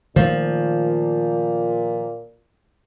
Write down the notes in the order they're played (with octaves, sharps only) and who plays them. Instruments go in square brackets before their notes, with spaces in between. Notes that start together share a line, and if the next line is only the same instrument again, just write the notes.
[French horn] A#2 [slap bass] D#3 A3 A#3 [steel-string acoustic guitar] F3